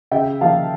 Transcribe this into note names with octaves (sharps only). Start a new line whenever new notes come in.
C#3 E5 G5
F3 A#3 F5 A5